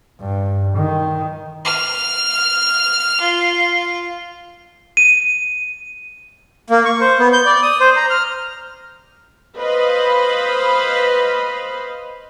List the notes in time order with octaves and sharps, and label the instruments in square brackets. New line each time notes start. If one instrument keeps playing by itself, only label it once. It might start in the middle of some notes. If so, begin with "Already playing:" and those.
[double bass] G2
D#3
[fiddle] F6
F4
[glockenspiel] D#7
[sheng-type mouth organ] A#3
C#6
C5
B3
G6
D5
D#6
C5
A#5
F6
[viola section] B4 C5 D#5 F5 B5